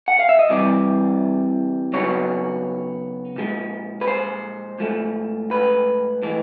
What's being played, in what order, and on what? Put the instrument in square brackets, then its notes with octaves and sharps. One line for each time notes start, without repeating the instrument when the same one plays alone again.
[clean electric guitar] F#5
F5
E5
D#5
C2 C3 E3 G3 D5
C#3 F#3 B3 D#4 C#5
A#2 F3 G#3
B4
C5
G#2 F3 A3
B4
A2 E3 G#3